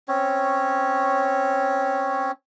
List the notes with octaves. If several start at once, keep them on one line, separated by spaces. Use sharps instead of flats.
C4 C#4 C#5